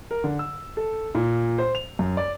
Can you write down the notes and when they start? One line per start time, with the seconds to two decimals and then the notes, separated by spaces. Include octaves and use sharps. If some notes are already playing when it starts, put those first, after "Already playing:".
0.11 A#4
0.24 D3
0.39 E6
0.77 A4
1.15 A#2
1.58 C5
1.75 F7
1.99 F#2
2.17 D5